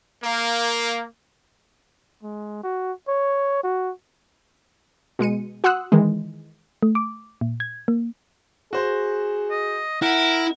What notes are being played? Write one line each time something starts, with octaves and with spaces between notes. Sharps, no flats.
A#3
G#3
F#4
C#5
F#4
B2 G#3 C#7 D#7
F#4 F#5 C6 D#6 E6 F#6
D#3 E3 G#3
A3
D6
A#2
G#6
A#3
F#4 G#4 C5
D#5
E4 A#4 F#5